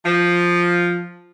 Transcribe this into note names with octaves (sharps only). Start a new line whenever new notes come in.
F3